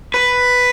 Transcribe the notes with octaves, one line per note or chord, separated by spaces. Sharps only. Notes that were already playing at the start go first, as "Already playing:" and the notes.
B4